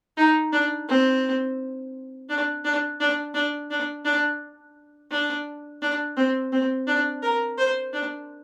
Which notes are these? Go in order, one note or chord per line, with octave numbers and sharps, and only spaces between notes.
D#4
D4
C4
D4
D4
D4
D4
D4
D4
D4
D4
C4
C4
D4
A#4
C5
D4